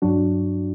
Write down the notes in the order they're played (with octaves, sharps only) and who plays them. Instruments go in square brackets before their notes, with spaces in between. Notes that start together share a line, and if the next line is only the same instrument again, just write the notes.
[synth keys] G2 F#3 D4 F#4